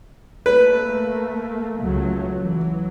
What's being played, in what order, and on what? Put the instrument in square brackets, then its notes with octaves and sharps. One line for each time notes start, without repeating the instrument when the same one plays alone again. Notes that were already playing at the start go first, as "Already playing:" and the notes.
[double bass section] A3 A#3 [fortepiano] B4
[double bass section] C#2 F#3 A3
E3 F#3